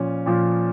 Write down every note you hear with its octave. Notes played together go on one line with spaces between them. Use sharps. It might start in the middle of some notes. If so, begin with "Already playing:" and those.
Already playing: A#2 F3 C#4
A#2 F3